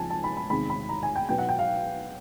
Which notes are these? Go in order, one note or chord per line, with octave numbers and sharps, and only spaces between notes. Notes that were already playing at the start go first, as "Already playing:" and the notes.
Already playing: C#2 C#3 F3 G#3 B3 G#5 A5
A5
B5
B5
E2 C3 D#3 G#3 C4 B5
B5
A#5
G#5
G5
B2 F#3 B3 G5
F#5
G5
F5